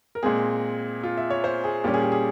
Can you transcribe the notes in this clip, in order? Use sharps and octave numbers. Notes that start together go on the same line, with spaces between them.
A#4
A#2 G#3 C4 G#4
F4
E5
C#5
C5
G#4
A#2 G3 C#4 G4
G#4
G4
G#4